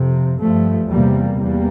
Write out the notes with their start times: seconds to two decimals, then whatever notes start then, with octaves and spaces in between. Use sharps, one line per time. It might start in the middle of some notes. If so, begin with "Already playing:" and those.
Already playing: F2 C3
0.38 G2 F3 A3
0.89 E2 C3 G3 A#3
1.40 E2 G3 A#3